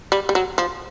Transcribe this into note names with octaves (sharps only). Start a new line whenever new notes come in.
G3
G3
F#3
F3